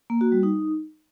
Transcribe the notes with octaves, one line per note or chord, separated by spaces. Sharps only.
A#3
F#4
G3
D#4